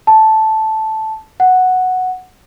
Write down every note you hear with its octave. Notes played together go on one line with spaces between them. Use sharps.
A5
F#5